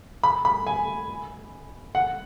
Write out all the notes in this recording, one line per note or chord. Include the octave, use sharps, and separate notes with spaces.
B5
B5
G#5
F#5